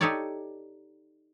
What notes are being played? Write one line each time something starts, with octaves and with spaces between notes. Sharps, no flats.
D#4 G4 A4 C#5 D5